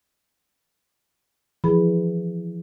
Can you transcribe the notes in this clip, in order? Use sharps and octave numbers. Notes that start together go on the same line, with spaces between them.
E3 F3 G#4 B5